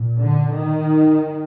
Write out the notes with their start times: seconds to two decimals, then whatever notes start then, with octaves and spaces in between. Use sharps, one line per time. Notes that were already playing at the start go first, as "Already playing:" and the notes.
Already playing: A#2
0.20 D3
0.58 D#3